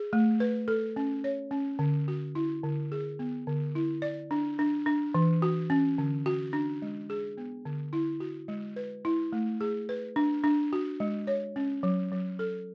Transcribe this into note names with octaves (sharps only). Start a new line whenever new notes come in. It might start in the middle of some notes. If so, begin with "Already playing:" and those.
Already playing: G#4
A3
B4
A4
C#4
C#5
C#4
D3
F#4
E4
D3
G#4
B3
D3
E4
D5
D4
D4
D4
E3
F#4
C#4
D3
F#4
D4
G#3
G#4
B3
D3
E4
F#4
G#3
B4
E4
A3
G#4
B4
D4
D4
F#4
G#3
C#5
C#4
F#3
F#3
A4